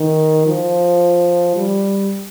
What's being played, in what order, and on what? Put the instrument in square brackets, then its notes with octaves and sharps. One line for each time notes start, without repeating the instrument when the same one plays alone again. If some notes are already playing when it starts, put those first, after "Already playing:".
Already playing: [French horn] D#3
F3
G3